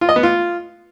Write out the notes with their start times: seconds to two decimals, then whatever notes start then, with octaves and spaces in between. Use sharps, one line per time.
0.01 F4
0.09 D#5
0.16 B3
0.23 F4